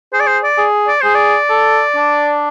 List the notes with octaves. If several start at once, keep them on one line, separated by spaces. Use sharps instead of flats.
G#4 C5
D5
C5
D5
G#4
D5
G#4 C5
D5
A4
D4